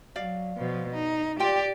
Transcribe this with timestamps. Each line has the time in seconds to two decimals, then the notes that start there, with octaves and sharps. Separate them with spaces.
0.16 F#3 D5 F5
0.57 B2 F3
0.94 D#4
1.40 F4 G4 D5 G5